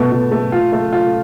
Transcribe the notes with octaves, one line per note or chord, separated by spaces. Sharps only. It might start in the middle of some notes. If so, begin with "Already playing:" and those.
Already playing: B2 A3
B2
A3
F4
A3
F4